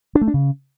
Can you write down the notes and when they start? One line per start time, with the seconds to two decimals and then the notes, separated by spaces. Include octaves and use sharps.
0.15 D4
0.21 A3
0.28 D4
0.34 C#3